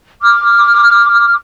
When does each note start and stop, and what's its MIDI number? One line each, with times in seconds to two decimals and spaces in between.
0.22 1.34 86
0.22 1.34 89